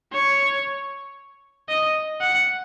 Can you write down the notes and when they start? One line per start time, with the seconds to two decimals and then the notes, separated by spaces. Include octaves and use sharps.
0.13 C#5
1.69 D#5
2.20 F#5